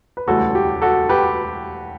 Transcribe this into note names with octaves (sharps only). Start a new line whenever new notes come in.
B4
E1 D2 C#3 E3 G3 F#4 A4
G4
F#4 A4
G4 B4